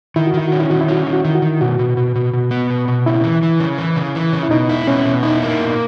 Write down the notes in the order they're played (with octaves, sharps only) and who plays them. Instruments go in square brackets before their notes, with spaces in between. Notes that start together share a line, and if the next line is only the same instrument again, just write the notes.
[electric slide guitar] D#3 [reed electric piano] E4
[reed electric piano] F#4
[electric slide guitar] D#3 [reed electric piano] E4
[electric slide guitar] C#4 [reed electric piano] F#4
[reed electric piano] E4
[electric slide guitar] D#3 [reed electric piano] F#4
[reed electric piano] E4
[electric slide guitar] C#4 [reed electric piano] F#4
[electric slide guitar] D#3 [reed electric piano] E4
[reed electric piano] F#4
[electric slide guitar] D#3 [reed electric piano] E4
[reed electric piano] F#4
[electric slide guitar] D#3 [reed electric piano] E4
[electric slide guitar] B2 [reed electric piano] F#4
[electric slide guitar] B2
B2
B2
B2
B3
B2
B2
[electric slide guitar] C#3 [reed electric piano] E4
[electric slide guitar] E3
E3
C#3
E3
C#3
E3
C#3
[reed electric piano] E4
[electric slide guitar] B2 [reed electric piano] D#4
[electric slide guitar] E4
[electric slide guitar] B2 [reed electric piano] C#4
[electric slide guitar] B2
[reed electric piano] D#4 [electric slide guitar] E4
[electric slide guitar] A#3
B2